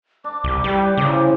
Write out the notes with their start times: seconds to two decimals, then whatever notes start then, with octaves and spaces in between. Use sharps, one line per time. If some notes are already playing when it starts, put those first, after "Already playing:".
0.24 D4 D6
0.44 C2
0.64 G3 B4 G5 C#6
0.98 A#2 C#3 E3 F3
1.13 C5